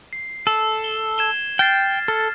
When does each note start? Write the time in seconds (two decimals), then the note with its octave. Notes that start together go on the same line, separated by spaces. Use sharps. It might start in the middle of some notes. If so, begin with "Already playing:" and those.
0.13 C7
0.47 A4
0.84 G7
1.18 G#6 E7 G7
1.59 G5 F6 A6 C7
2.08 A4 F6